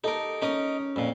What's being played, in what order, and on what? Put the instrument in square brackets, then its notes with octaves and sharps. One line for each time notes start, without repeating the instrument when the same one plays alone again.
[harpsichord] D#4 A#4 [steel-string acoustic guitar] G4 A4
[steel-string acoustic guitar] C#4 [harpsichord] D#4 A#4 D#6
[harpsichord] F2 A#2